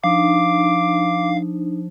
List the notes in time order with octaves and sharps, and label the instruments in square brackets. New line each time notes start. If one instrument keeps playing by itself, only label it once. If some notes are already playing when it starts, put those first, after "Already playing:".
[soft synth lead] F3 [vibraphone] D4 D#4 [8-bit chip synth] F5 [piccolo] D6